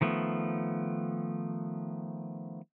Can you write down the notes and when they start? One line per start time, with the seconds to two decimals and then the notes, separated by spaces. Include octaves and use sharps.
0.01 D#3 F3 A3 B3